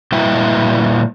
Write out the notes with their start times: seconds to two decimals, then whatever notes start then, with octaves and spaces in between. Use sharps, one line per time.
0.12 A#2 G3 E4 B4 E5 G5